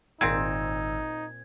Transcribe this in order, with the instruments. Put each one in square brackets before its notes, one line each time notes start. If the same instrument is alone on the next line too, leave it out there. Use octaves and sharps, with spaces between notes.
[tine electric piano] G#1 E6 [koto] A#2 C4 [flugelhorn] D#4 [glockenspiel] G#6